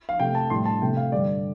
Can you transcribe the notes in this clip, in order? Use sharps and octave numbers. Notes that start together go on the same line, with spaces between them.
F5
C3 A3 G5
A5
A2 G3 C6
A5
C3 A3 G5
F5
G2 D3 G3 D5